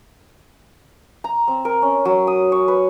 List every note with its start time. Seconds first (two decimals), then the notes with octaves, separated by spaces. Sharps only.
1.24 A#5
1.48 C4
1.65 A#4
1.82 C#4
2.05 F#3
2.27 D#6
2.52 C#5
2.68 B4